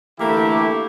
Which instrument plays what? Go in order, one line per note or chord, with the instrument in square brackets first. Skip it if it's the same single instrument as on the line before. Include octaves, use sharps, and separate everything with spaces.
[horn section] D3 E3 A3 A#3 E4 G4